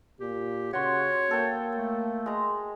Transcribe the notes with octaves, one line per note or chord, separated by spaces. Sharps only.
A#2 G4
C#3 F#4 C#5 C6
A#3 A4 G5
A3
G#3 A#5